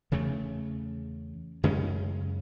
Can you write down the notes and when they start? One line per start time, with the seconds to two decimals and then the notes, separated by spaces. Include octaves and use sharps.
0.12 E2 C#3 E3 A3
1.63 F#2 C#3 G#3 C#4